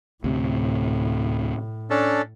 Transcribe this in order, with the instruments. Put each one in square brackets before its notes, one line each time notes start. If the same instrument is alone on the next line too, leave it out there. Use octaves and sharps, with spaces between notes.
[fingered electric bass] D2 C3 [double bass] A2
[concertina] C#4 D4 A4